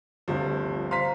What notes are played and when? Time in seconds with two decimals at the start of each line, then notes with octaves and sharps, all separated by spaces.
0.28 G1 D2 C3 F3
0.91 C5 F5 A#5 C6 B6